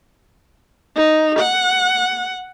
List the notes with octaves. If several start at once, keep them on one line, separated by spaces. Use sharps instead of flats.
D#4
F#5